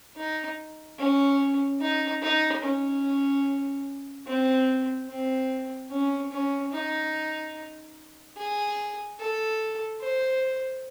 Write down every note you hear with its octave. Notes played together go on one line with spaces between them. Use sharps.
D#4
C#4
D#4
D#4
C#4
C4
C4
C#4
C#4
D#4
G#4
A4
C5